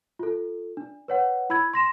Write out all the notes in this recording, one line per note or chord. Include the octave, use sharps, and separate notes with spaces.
F4 A4
D4
B4 C#5 F#5
E4 B5 E6 G#6
C6 A#6 E7